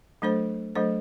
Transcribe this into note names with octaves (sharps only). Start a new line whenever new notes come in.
F#3 A3 D4 A4 C5
F#3 A3 D4 A4 C5